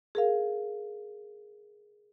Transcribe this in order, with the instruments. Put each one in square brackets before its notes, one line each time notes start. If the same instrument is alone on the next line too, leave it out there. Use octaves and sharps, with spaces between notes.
[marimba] G#4 A#4 F5